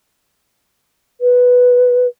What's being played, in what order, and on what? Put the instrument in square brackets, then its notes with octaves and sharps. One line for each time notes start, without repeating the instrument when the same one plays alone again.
[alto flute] B4